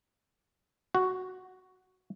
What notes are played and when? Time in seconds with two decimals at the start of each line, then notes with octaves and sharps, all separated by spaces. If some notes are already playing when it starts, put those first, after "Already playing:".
0.95 F#4